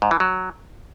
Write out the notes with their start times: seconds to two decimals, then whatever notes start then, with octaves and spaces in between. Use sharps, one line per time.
0.02 G#2
0.11 E3
0.20 F#3